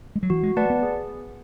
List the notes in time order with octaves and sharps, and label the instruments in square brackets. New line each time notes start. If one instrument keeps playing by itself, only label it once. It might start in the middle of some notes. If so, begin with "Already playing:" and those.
[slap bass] G#3
F#3
[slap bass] E3 [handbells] F#4
[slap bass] G#3
[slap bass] A3 [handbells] B4 D5 F#5 A5
[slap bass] B3
[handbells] G#4